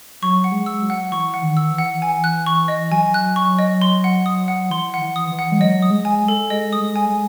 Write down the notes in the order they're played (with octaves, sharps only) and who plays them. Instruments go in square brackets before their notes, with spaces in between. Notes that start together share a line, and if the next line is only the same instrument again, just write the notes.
[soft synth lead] F#3 [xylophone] C#6
[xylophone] F#5
[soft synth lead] G#3
[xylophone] E6
[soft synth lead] F#3
[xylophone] F#5
[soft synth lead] E3 [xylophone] C#6
[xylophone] F#5
[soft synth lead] D#3
[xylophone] E6
[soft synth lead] E3
[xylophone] F#5
G#5
F#6
C#6
D#5
[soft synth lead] F#3 [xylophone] G#5
[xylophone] F#6
C#6
D#5
C6
F#5
D#6
F#5
[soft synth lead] E3 [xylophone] C6
[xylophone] F#5
[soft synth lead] E3
[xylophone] D#6
[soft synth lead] E3
[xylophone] F#5
[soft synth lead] G#3
[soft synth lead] F#3 [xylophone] D#5
[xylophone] D#6
[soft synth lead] G#3
[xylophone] G#5
A4
[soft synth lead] G#3 [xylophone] D#5
[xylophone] D#6
[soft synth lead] G#3
[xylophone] G#5
[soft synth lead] G#3